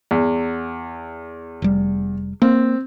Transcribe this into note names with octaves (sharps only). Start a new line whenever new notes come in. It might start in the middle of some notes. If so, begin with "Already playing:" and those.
E2
F1 G3
A#3 C4